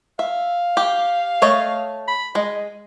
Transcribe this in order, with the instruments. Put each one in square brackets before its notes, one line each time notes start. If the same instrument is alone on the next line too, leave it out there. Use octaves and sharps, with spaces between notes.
[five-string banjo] E5 [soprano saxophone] F5
[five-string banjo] G4
A3 C#5 D#5
[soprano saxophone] B5
[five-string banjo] G#3 [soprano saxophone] D#5